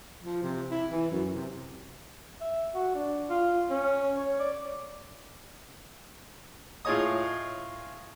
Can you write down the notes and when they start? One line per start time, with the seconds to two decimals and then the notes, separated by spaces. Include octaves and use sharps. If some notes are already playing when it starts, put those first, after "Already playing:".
0.24 F3
0.43 C3
0.71 E4
0.91 E3
1.11 F#2
1.34 C3
2.41 E5
2.74 F#4
2.95 D4
3.30 F4
3.70 C#4
4.17 C#5
4.40 D5
6.85 A2 F4 G#4 C#5 D#5 D#6